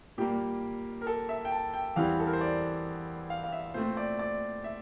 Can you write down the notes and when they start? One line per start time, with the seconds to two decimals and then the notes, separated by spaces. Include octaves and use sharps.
0.18 A#2 G3 A#3 G4
1.01 A#4
1.07 A4
1.29 E5
1.45 G5
1.51 A5
1.74 G5
1.96 E2 E3 G3 C4 F5
2.20 A4
2.27 A#4
2.33 C5
2.41 D5
3.30 F5
3.44 F5
3.52 E5
3.74 A#2 A3 C4 C5
3.97 D5
4.19 D5
4.64 E5